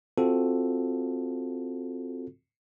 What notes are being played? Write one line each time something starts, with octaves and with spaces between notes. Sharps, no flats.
C4 F4 F#4 A4